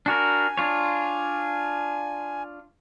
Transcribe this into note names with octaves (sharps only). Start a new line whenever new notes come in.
D4 F#4 A#4 G#5
D4 F4 C#5